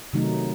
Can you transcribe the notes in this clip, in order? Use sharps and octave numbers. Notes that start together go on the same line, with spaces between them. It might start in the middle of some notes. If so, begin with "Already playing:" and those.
C3 D#3 F#3 A3 D#4